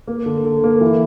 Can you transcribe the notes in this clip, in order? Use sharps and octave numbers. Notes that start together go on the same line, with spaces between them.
A#3
D3
D3
A#3
E3